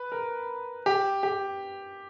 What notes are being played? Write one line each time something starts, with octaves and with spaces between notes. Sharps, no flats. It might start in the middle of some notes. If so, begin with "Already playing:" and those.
Already playing: B4
A#4
G4
G4